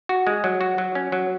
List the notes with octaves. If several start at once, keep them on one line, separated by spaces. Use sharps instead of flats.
F#4
G#3
F#3
F#4
F#3
C#4
F#3